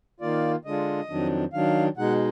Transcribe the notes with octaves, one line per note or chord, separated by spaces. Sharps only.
D#3 A#3 F4 D5
D3 G#3 D4 F4 D#5
F2 D#3 F#3 D4
D#3 F#3 D4 F5
B2 G#3 D#4 F#5